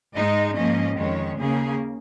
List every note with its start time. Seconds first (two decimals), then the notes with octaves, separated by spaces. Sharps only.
0.15 G#2 G#3 D#4 D#5
0.56 G#2 F3 A#3 C#4 D#5
0.98 F2 D#3 G#3 C#4 C#5
1.39 D#2 C#3 A#3 C#4 G#4